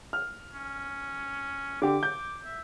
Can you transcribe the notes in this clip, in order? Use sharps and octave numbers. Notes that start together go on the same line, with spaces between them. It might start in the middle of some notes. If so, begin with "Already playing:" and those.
F6
C#4
D3 G4 D6
G6
E5